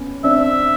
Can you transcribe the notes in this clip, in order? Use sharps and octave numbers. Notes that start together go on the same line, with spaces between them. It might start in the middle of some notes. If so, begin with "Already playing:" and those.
Already playing: B3 C#4
C4 D4 E5